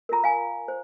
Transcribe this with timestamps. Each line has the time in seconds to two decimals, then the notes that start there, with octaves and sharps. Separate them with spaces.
0.09 F4 A#4 A#5
0.24 F5 G#5
0.68 C5